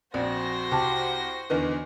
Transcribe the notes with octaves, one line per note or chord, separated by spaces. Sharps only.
A#1 F2 F#4 C5 D5 A#6
C2 G4 A5
E2 D3 D#3 B4 D#5